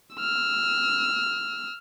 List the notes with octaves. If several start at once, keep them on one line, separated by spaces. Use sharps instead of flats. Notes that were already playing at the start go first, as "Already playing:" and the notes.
E6 F6